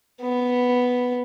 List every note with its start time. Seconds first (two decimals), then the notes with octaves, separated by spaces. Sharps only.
0.22 B3